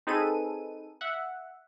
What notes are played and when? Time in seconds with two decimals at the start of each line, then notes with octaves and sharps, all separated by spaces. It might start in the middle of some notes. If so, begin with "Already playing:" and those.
0.07 C4 D#4 G#4 A4 B4 D#7
1.01 E5 F#5